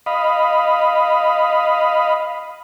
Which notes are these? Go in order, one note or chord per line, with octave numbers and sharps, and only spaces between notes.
D#5 F5 B5